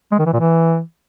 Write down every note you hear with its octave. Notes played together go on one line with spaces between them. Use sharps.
G#3
D#3
E3
A#2
E3